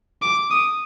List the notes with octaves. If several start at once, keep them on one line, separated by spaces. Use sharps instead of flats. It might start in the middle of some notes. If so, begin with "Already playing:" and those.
D6
D#6